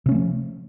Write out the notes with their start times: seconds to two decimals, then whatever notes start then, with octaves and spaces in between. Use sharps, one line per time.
0.06 C3
0.09 C#4
0.12 A3
0.14 F3